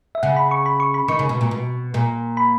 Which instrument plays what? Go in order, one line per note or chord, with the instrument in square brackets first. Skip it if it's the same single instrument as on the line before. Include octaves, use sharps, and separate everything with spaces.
[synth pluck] E5
[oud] C#3 [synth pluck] F#5
[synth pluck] B5
C#6
B5
C#6
B5
[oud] D#3 [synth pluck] C#6
[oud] C#3
B2
A#2
B2
A#2
[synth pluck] B5